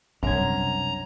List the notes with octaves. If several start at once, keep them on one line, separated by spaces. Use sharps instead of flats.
C2 F#2 D4 A#5 G#6